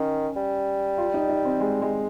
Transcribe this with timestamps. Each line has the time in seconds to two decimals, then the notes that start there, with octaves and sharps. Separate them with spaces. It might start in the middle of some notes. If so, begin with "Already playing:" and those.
Already playing: D#3 C#4
0.36 G3
0.98 F4
1.14 D#4
1.29 D#4
1.45 C4
1.60 G#3
1.82 G#3